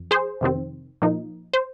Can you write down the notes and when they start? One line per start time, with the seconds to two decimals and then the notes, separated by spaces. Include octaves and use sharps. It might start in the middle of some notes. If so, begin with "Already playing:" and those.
Already playing: F2
0.11 G#4 C5
0.41 F2 C3 D#3 C4
1.02 A#2 F3 A#3 D#4
1.54 C5